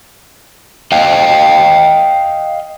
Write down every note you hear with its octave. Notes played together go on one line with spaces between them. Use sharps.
D#5 F5 G5